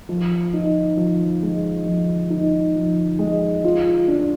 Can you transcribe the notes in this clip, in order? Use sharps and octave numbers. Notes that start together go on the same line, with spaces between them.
F3
D#4
F3
G#3
F3
D#4
F3
G#3
F4
D4